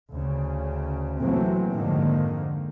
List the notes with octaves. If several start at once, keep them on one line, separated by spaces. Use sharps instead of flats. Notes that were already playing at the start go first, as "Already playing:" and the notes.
D2 C#3
C3 E3 F#3 A3 A#3 C4
F2 G#2 D3 D#3 A#3